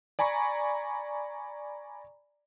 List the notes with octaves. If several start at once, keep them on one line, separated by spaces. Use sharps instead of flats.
D5 G#5 A#5 B5 C#6